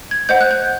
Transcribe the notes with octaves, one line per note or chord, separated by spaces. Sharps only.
G#6
C5 D#5 F#5 G6
F#6
G6